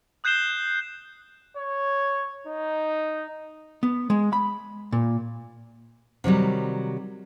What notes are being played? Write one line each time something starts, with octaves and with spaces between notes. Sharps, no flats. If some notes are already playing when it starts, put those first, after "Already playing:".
D#6 F#6 G6 C7 E7 G7
C#5
D#4
B3
G#3
B5
A#2
C3 D#3 F#3 G3